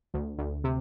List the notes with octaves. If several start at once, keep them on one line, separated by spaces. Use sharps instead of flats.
D2
D2
C3